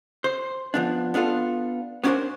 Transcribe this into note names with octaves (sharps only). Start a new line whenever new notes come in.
C5
F3 B3 D4
B3 D4 F4 A4
B3 C#4 D4 F#4 A#4 C5